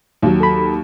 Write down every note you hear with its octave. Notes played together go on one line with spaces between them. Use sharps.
D#2 F#3
A4 B5